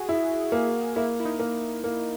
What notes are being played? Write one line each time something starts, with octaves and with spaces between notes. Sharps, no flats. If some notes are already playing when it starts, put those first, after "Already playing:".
Already playing: F#4 G#4
E4
A#3
A#3 E4
E4
D#4
A#3
A#3